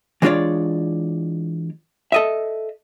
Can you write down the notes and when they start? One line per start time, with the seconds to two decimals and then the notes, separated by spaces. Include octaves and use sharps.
0.22 E3 G#3 D4 F4 C#5 D5
2.12 A4 D#5 E5